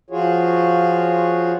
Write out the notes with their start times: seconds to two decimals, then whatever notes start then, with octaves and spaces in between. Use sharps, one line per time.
0.11 F3 F4 F#4 G#4 C#5